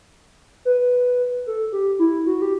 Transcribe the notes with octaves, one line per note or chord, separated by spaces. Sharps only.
B4
A4
G4
E4
F#4
G4